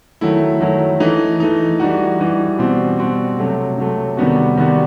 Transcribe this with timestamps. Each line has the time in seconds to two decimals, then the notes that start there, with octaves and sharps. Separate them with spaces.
0.21 D#3 F#3 A3 E4
0.61 D#3 F#3 A3 E4
1.00 E3 A3 D#4
1.40 E3 A3 D#4
1.80 E3 G3 D#4 F#4
2.20 E3 G3 D#4 F#4
2.59 B2 G3 C4 F#4
2.99 B2 G3 C4 F#4
3.39 C3 F#3 A3
3.78 C3 F#3 A3
4.17 C3 D#3 G3 B3 F#4
4.57 C3 D#3 G3 B3 F#4